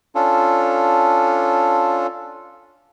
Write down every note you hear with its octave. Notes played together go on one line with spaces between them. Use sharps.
C#4 D4 F4 A4